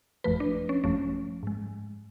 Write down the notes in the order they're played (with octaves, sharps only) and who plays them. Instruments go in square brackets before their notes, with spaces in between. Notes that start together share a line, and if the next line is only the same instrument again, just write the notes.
[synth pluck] G#1 F#2 F3 A3 B4
D4
C#4
G#1 F#2 F3 A3 C#4
G#2 G#3